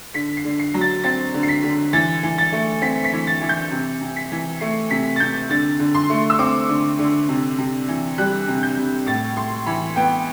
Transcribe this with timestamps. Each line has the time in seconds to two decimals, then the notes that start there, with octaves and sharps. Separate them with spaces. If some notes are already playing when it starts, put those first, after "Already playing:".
0.14 D3 B6
0.37 C7
0.44 D3
0.59 C7
0.74 F#3
0.81 A6
1.04 C4 A6
1.34 D3
1.43 C7
1.48 B6
1.63 D3
1.93 E3 A6
2.23 E3
2.38 A6
2.53 A3
2.82 C4 B6
3.04 B6
3.13 E3
3.27 A6
3.41 E3
3.49 G6
3.71 C3
4.01 C3
4.16 B6
4.32 E3
4.60 A3 C7
4.90 C3 B6
5.16 A6
5.20 C3 G6
5.49 D3 A6
5.80 D3
5.95 C6
6.10 A3
6.30 E6
6.39 C4 D6
6.69 D3
6.99 D3
7.29 C3
7.58 C3
7.88 E3
8.18 G3 F#6
8.48 C3
8.63 G6
8.77 C3
9.06 A2 A6
9.37 A2 C6
9.66 E3 B5
9.96 B3 G5